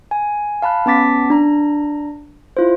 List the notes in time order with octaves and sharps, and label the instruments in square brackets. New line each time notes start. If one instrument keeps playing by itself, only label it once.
[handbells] G#5
F5 A5 B5 F#6
B3 C#4 A5 D6 A6 B6
D4 A#5
E4 F4 C5